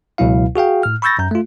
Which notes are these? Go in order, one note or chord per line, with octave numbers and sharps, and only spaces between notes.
C#2 B2 F#3 E4 F5
F#4 G#4 F5 G5
A2 F6
B5 C#6 E6 G6 A6 A#6
F#2 A#5 G6
A3 F4